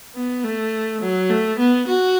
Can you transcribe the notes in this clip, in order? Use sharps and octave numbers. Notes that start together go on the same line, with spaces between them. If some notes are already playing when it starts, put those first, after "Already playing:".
B3
A3
F#3
A3
B3
F#4